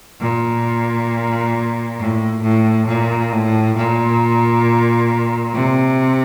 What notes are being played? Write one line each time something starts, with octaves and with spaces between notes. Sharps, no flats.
A#2
A2
A2
A#2
A2
A#2
C3